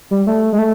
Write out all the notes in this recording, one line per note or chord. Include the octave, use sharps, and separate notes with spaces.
G3
A3
G#3
A3